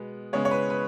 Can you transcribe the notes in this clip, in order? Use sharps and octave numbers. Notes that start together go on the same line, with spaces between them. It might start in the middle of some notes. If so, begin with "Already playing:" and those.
Already playing: B2 G#3 B3
C#3 G#3 B3 C#5
C#5
B4
B4